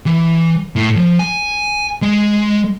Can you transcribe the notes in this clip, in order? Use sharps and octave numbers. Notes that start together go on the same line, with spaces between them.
E3
A2
F3
G#5
G#3